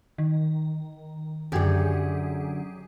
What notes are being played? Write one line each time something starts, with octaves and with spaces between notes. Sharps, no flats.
D#3
F#2 D3 F#3 G4 G#4